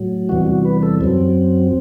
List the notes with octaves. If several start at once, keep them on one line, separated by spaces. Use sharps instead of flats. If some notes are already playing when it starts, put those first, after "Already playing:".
Already playing: A2 F#3
E2 C3 E3 G3 F#4
F#4
B4
A4
F#2 F#3 C4